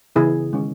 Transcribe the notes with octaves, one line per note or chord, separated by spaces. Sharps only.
C#3 E3 B3 E4 G#4
D#3 G#3 C#4